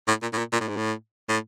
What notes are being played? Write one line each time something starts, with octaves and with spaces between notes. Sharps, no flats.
A2
A#2
A2
A#2
A#2
A2
G#2
A2
A2